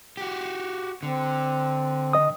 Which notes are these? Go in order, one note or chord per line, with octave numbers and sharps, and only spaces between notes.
F#4 G4
D3 C4
D#5 D#6